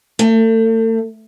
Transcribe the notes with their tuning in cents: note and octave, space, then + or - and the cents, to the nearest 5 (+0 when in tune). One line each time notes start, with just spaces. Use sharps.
A3 +35